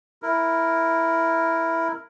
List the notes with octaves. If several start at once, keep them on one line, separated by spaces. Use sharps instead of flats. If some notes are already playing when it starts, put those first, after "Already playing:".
E4 A#4